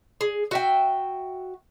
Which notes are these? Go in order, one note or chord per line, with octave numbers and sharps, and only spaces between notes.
G#4
F#4 E5 G5